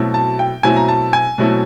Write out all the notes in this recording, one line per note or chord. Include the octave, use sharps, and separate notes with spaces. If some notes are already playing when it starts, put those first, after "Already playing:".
Already playing: B2 F#3 A3 C4 E4
A5
G5
B2 F#3 A3 C4 E4 G#5
A#5
A5
G#5
B2 F#3 A3 C4 E4